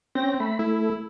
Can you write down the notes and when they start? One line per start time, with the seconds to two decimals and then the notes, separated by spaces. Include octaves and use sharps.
0.15 C4 C#4 G5 A#6
0.40 A3 B5
0.59 A3 E4